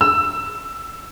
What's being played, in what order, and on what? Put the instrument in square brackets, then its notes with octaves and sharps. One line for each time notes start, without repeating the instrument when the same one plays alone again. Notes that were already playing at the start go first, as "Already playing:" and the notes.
[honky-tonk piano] E6